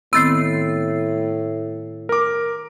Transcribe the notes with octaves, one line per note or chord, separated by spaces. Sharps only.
A2 D#3 B3 C4 E6 A6 C7
A#4 D6